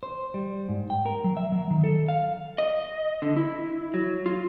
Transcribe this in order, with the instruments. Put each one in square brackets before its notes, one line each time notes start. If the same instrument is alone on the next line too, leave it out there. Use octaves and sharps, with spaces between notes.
[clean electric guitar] C5
G3
G#2
G5
A#4
F#3
E5
F#3
D#3
A4
F5
[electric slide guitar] D#5
D3
E4
F#3
F4